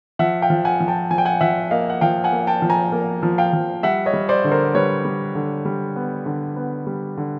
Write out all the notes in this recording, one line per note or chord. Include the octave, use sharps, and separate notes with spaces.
F3 E5 F#5
F5 G5
F3
F#5 G#5
F3
G5 A5
F3 G#5
G5
F#5 G#5
F3 E5 F#5
A#3 D#5 F5
F#5
F3 F5 G5
F#5 G#5
A#3
G5 A5
F3
G#5 A#5
A#3
F3
F5 G5
F3
G3 E5 F#5
C#5 D#5
G3
C5 D5
D3
A#4 C5
G3 B4 C#5
G3
D3
G3
B3
D3
B3
G3
D3